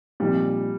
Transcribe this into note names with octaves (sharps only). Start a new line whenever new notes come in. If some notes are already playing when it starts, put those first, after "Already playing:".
A#2 F3 G3 C4 D#4